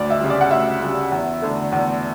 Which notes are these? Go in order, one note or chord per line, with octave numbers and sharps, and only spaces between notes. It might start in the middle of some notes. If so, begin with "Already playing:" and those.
Already playing: D2 D5
E5
C#3 G3
D5
F#5
D2 E5
C#3 G3
E2
D3 A3
E2